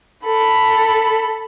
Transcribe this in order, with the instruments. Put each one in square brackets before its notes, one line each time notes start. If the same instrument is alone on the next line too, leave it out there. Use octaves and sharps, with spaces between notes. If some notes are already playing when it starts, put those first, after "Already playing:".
[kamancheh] A4 B5